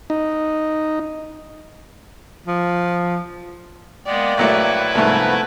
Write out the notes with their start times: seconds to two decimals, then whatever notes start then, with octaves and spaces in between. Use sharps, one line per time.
0.10 D#4
2.47 F3
4.06 G#3 A#3 B3 D5 G5
4.37 A#1 F#3 A3 E4 B4
4.95 C2 G#2 F3 A3 B3 A#5